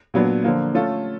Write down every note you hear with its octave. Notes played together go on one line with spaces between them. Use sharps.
A#2 F#3 B3 D4
D3 F3 A#3
A3 C#4 F4 A4